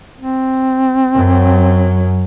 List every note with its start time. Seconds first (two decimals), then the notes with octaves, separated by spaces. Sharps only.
0.20 C4
1.14 F#2 F#3